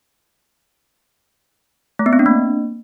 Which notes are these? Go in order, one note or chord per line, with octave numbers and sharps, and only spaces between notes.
A3
B3
C4
D4
A#3